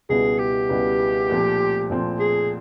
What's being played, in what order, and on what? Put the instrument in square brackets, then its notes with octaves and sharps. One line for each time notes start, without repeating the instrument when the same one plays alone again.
[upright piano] C#2 B2 G3 B3 E4 [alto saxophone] G#4
[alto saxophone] G4
[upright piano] C#2 B2 G3 B3 E4
A#2 F3 A3 C4
A#2 F3 A3 C4
[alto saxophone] G#4